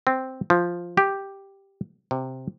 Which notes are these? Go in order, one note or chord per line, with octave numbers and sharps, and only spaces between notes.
C4
F3
G4
C3